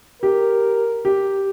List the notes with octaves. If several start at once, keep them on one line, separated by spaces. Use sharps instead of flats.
G4 A#4
G4